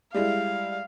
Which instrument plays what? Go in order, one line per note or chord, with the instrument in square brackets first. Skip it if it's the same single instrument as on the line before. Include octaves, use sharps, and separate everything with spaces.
[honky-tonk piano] G3 G#3 E4 [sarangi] F5